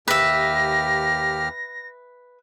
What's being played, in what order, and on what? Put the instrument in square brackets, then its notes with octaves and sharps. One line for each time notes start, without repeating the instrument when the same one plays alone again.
[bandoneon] D#2 G4 F6 [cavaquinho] B4 E5 [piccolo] A#6